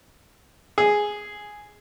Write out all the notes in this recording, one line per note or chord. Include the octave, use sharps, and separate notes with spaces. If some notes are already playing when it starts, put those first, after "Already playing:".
G#4